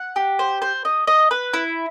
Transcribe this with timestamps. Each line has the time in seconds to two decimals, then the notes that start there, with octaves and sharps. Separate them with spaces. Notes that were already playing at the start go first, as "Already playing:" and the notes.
Already playing: F#5
0.16 G4
0.39 C5
0.62 C5
0.85 D#5
1.07 D#5
1.31 B4
1.54 E4